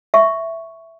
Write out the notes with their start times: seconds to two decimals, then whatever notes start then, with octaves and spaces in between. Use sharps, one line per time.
0.14 E5 C#6